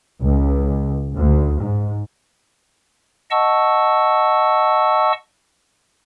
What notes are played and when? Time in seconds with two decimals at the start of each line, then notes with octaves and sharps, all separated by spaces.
0.21 C#2
1.17 D2
1.60 G#2
3.31 D#5 F#5 A5 C#6 E6